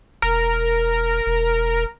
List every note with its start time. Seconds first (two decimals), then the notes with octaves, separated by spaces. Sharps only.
0.22 E1 A#4
1.26 E1